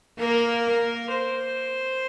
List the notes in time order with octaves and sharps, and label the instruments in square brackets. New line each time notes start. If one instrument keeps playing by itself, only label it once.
[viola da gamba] A#3 [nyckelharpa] A#4
[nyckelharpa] C5